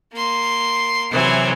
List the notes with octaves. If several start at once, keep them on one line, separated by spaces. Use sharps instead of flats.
A#3 C6
C3 E3 F#3 C5 G#5